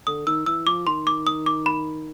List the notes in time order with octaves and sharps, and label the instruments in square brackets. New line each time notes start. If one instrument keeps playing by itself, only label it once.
[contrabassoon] D3 [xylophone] D#6
[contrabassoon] D#3 [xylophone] E6
[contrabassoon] E3 [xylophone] E6
[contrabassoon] F3 [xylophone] D6
[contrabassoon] D#3 [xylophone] C6
[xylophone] D6
D#6
D6
B5